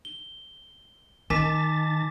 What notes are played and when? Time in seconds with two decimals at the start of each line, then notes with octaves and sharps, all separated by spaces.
0.05 G7
1.30 D#3 D#4 G#5 A5 D6 A6 B6